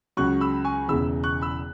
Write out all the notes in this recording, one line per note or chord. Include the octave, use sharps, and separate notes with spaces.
C#2 C#3 F#3 C#6 F#6
B5 E6
G#5 C#6
E1 E2 C#3 E3 B5 E6
C#6 F#6
B5 E6